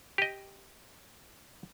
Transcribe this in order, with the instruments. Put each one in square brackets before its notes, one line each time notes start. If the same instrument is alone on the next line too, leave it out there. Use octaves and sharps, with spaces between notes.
[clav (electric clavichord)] G4 D#5